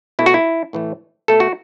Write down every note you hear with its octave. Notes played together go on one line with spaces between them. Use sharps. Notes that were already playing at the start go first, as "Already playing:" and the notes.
B2 A3 E4
F#4
E4
A2 E3 A3
B2 A3 A4
F#4